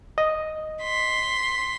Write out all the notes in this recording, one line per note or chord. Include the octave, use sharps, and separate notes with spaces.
D#5
C6 B6